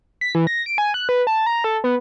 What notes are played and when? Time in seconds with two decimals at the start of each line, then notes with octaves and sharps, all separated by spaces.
0.21 B6
0.35 E3
0.47 A#6
0.66 D7
0.78 G#5
0.94 F#6
1.09 B4
1.27 A5
1.46 A#5
1.64 A4
1.84 B3